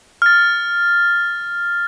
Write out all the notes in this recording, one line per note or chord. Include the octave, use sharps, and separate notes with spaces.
F6 A6